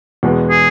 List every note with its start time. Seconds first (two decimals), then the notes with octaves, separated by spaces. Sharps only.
0.23 E2 B2 G#3 B3
0.50 G#4